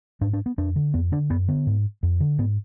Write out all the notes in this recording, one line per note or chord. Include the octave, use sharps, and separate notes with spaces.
G#2 D4
D4
B3
F2 D4
D3
F2 B3
D3 D4
F#2 B3
D3 B3
G#2
F2
D3
G#2 B3